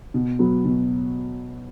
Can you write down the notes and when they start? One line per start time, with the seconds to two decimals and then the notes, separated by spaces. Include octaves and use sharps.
0.14 B2
0.39 F#3 B3 F#4
0.65 B2